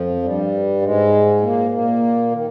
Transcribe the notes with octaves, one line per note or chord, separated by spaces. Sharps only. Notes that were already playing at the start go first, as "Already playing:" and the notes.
Already playing: F2 F3
G2 G3
G#2 G#3
A#2 A#3
A#2 A#3
D#3